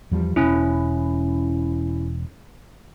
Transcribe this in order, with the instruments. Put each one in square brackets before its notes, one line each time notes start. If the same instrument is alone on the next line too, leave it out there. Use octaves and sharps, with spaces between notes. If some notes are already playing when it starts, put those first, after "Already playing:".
[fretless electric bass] E2 F3 G3
[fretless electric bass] E1 [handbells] C#4 E4